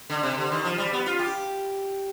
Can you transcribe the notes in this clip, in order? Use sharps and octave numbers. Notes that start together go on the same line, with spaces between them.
D3
C3
D3
D#3
F3
G3
B3
F4
G4